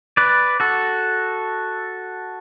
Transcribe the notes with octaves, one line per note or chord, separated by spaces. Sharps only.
B4 D5
F#4 A4